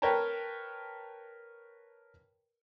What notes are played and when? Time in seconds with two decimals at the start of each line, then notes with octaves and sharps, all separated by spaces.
0.02 A#4 B4 C#5 G5 A5 A#5